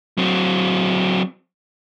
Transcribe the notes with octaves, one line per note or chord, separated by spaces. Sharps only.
F#3 C4